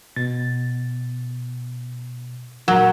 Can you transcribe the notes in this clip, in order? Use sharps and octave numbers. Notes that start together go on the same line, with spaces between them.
B2 A6
A#2 F#3 A#4